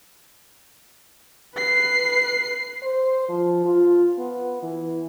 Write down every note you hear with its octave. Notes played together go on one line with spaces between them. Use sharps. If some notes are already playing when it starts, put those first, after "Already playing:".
B4 C7
C5
F3
F4
B3
E3